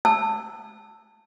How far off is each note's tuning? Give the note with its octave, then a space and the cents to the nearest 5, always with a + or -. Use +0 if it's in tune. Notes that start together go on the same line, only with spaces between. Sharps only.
A5 +15 E6 +0